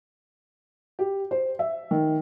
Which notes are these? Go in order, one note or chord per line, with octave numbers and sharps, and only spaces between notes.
G4
C5
E5
D#3